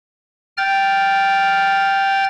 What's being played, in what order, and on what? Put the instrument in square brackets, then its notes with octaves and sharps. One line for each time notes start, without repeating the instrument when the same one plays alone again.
[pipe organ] G5 F6 A6